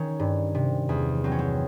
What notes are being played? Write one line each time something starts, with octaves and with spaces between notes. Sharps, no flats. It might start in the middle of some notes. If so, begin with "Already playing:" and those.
Already playing: D#3 C#4
G2
C3
E2
F#3 C4
C#4
C4